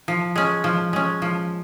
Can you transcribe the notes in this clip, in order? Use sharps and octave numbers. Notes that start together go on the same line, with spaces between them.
F3
G#3 C#4
F3
G#3 C#4
F3